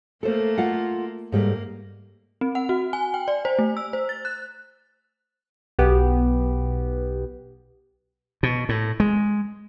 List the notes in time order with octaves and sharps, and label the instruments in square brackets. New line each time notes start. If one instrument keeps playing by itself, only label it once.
[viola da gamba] A3 A#3 [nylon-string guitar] A4 C5
[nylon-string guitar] F4 F5 F#5
[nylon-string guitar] G#2 G3 A3 [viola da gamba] A#3
[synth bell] C4
F#5
F#4
G#5
G5
D5
C5
A3
E6
C5
A6
F#6
[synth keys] B1 B3 G4
[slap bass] B2
A2
G#3